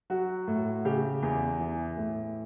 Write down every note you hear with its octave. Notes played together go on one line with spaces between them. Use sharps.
F#3 F#4
A2
C#3 G4
E2
E3
A2